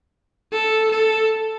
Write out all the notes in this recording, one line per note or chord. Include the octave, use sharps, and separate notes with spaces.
A4
A4